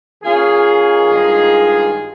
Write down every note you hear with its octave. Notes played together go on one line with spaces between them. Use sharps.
D#3 A#3 C#4 F4 G#4
G2 D#3 G#3 D#4